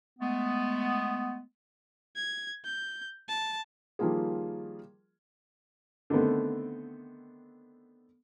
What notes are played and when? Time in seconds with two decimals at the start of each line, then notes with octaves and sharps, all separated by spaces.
0.19 G#3 A3 B3
2.16 G#6
2.65 G6
3.29 A5
3.99 D#3 F3 G3 A#3 F4 G#4
6.10 D3 D#3 A3 B3 C4